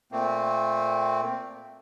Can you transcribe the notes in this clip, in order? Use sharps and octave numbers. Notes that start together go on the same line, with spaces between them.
A#2 A3 A#3 C4